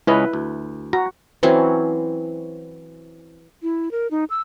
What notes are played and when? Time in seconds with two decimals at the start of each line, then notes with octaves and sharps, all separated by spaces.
0.07 C#2 C#4 E4 B4 D#5
0.33 D2
0.93 F#4 A#5
1.43 E3 F#3 C4 C#4
3.62 E4
3.91 A#4
4.11 D#4
4.30 E6